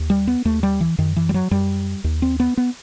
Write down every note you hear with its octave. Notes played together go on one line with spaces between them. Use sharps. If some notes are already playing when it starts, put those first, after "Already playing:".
Already playing: D#2
G3
B3
D#2 A3
G3
E3
F#2 D#3
E3
G3
F#3
F#2 G3
D#2
C4
B3
B3